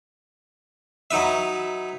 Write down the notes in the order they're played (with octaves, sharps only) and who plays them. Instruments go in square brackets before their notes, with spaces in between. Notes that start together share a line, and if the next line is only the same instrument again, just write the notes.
[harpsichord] F#3 D#4 B4 E5